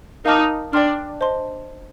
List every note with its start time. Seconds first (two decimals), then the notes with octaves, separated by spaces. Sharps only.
0.25 D#4 A#4 F5 A5 D6 F6
0.73 D4 D5 G5 C6 F6
1.21 C5 D#5 A5 C6